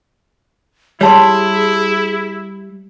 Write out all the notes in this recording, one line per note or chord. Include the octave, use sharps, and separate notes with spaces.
G3 E4 G#4 C#5 A5 C6